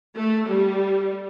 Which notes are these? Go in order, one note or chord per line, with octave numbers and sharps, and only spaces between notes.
A3
G3